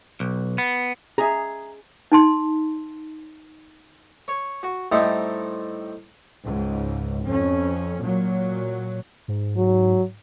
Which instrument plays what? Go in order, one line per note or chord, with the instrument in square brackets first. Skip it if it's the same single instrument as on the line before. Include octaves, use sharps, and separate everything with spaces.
[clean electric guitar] B1
B3
[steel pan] G#4 [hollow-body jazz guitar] E5 A#5
[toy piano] D#4 A5 C6
[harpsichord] C#5
F#4
A2 G3 A3 C4 D#4 E4
[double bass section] C#2 G#2
F2 C#4
A#2 F#3
[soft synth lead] G#2
[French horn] F#3